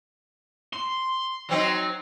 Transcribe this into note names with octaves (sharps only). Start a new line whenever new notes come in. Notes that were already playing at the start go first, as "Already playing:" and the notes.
C6
F#3 C4 D#4